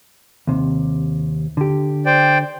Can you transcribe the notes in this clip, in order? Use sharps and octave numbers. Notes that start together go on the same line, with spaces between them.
D#2 C3
D3 G4
C5 D5 G5